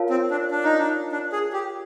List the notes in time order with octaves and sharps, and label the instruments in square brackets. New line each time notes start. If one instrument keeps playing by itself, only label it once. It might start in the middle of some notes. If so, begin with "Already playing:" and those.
Already playing: [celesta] F4 A#4 C#5 F5 A5
[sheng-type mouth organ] C4
D4
D4
D#4
D4
D4
G#4
G4